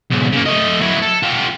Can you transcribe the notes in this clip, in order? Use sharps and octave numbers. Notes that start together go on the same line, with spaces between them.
B1 G#2
C#3 A#3
A3 D#5
F#3 E4
A4
F4 G4